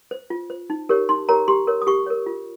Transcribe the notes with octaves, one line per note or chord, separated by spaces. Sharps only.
C5
F4
C5
D#4
G4 A#4 C#5
D#4 C6
G4 A#4 C#5 A#5
G4 C6
A#4 C#5
D#6
G4 C#6
A#4 C#5
F4